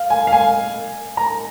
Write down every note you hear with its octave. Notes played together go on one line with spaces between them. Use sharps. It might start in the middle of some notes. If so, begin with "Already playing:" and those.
Already playing: F5
G#5
F5
G#5
A#5